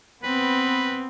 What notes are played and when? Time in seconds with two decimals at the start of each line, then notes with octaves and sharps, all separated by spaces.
0.24 B3 C4 B4